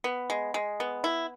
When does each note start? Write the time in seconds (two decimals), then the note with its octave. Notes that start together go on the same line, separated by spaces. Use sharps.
0.04 B3
0.30 G#3
0.54 G#3
0.80 B3
1.04 E4